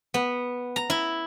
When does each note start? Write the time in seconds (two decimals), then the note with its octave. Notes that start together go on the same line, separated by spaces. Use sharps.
0.14 B3
0.76 A#5
0.90 E4